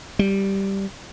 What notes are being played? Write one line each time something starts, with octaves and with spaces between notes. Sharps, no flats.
G3